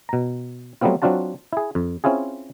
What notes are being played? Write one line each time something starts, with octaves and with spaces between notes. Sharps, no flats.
B2 A#5
F#3 G3 A3 B3 C4 F4
F#3 C4 D4 F4 F#4 A5
E4 G#4
F2
C4 C#4 E4 F4 G#4